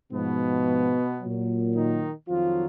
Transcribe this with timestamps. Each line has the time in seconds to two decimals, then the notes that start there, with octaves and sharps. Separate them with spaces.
0.12 G#2 B2 F3 B3
1.20 A#2 F#3
1.74 D#3 D#4
2.28 F2 D#3 F3 F#3 F4